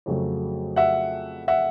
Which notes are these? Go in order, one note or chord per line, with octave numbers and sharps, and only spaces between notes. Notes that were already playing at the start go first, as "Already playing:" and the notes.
F2 C#3 F#3 A3
E5 F#5
E5 F#5